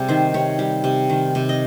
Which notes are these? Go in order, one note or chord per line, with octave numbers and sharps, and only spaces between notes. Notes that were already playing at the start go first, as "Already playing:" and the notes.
Already playing: C3 G3 G#4
D#3 C5
C3 C#5
G3
C3
D#3
C3
D#5